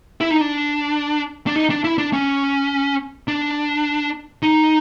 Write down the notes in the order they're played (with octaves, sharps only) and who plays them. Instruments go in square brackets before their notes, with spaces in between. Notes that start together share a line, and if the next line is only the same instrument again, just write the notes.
[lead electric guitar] E4
D#4
D4
D4
D#4
D4
E4
D4
C#4
D4
D#4